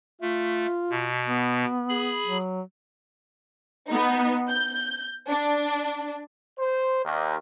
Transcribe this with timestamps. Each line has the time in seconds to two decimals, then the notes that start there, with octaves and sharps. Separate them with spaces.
0.21 A3 F4
0.90 B2
1.27 B3
1.89 G#4 B5
2.25 F#3
3.88 B3 D#4
4.49 G6
5.29 D4
6.59 C5
7.04 D#2